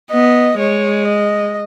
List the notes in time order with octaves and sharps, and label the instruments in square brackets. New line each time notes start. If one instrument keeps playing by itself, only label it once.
[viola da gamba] B3 [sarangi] D#5
[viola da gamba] G#3 [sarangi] C#5
[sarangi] D#5